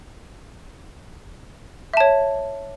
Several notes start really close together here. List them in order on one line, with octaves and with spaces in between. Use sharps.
E5 A5 C#5